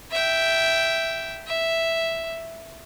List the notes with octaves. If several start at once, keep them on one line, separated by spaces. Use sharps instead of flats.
E5 G5
E5